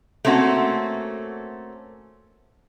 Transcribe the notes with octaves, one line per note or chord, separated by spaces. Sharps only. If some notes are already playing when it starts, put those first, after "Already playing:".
A3 A#3 C4 C#4 F#4